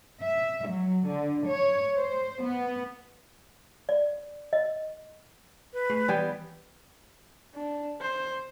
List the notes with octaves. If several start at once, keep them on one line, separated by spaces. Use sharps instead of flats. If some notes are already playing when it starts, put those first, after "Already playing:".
E5
F#3
D3
C#5
C5
B3
D5
D#5
B4
A3 G#4
E3 G3 B3 G5 G#5
D4
C5